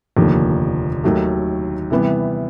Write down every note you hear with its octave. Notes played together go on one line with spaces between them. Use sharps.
F1 D#2 D3 F3 A#3
D#2 D#3 F#3 A3
C3 E3 G3 B3